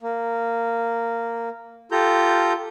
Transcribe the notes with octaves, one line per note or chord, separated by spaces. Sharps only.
A#3
F4 G4 A4 A#5 G6